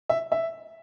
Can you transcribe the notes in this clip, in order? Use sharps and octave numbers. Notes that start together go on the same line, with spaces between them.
E5
E5